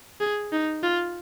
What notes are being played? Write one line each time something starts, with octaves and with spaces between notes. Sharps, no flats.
G#4
D#4
F4